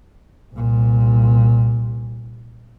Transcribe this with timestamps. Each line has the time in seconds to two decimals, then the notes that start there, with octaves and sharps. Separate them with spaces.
0.54 C2 A#2